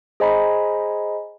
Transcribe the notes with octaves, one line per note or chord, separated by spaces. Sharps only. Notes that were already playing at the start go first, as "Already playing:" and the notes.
G#4 C5 D#5 G#5 A#5 B5